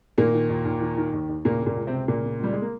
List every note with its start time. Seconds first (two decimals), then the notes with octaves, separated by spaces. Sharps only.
0.18 A#2 D#3 A#3
0.33 D#3
0.49 D#2
0.65 D#2
0.81 D#3
0.97 D#3
1.13 D#2
1.29 D#2
1.45 A#2 C#3 A#3
1.61 C#3
1.66 A#2 A#3
1.77 C#2
1.87 C3 C4
1.93 C#2
2.08 A#2 C#3 A#3
2.24 C#3
2.40 C#2 G3
2.53 G#3
2.62 A#3